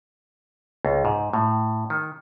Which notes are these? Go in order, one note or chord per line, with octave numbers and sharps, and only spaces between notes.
C#2
G#2
A2
D#3